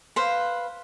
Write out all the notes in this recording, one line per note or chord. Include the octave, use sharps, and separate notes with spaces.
B4 C5 F5